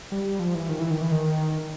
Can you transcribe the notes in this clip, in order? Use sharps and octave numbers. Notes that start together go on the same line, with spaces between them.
G3
F3
E3
D#3
E3
D#3
E3
D#3